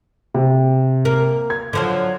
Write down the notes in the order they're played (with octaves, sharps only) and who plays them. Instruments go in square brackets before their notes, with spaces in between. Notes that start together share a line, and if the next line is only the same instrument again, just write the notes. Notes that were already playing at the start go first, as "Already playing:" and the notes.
[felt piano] C3
[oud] A#3
[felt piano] G#6
[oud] D3 F3 F#3